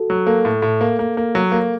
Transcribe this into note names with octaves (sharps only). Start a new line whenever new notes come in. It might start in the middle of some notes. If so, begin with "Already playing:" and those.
Already playing: F#4 A4
F#3
A#3 A4
A2
A2
A#3
A#3
A#3
F#3
A#3